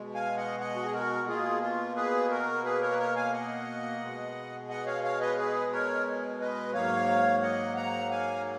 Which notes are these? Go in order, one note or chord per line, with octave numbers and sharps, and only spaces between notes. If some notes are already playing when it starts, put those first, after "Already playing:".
Already playing: B2 G#3
F5 G#5
D#5 F#5
D#5 F#5
F#4
G#4
F#4 A#4
B2 A#3 F4 G#4
F4
G#4 B4
F#4 A#4
G#4 B4
A#4 C#5
B4
A#4 C#5
F5 G#5
D#5 F#5
B2 G#3
D#5 F#5
C#5 F5
C#5 F5
B4 D#5
G#4 B4
A#4 C#5
B4 D#5
G#2 F#3 A#3 C#5 F5
D#5 F#5
F#5 A#5
F5 G#5